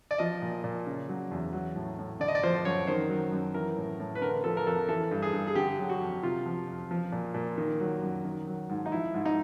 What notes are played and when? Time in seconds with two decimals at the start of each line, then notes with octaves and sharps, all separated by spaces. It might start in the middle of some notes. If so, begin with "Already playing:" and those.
0.11 D5
0.18 F3 D#5
0.42 A#2
0.64 A#2
0.86 C#3
1.09 F#3
1.31 E2
1.53 F#3
1.76 A2
1.99 A2
2.20 D3 D5
2.28 D#5
2.35 D5
2.43 F3 C5
2.65 F#2 C#5
2.87 D#3 C5
3.09 F#3
3.32 F#2
3.54 E3 A#4
3.77 A2
4.00 A2
4.15 B4
4.21 D3 A#4
4.44 F3 A4
4.57 A#4
4.67 F2 A4
4.88 E3 A4
5.11 G2
5.22 G#4
5.33 G2
5.47 G#4
5.55 D3 G4
5.79 F#3
5.89 F#4
6.01 F2
6.23 C3 F4
6.46 F3
6.67 F2
6.91 F3
7.12 A#2
7.34 A#2
7.58 D#3
7.80 F#3
8.02 F#2
8.25 D#3
8.47 F#3
8.69 G#2
8.86 D#4
8.91 F3 E4
9.14 G#2
9.25 D#4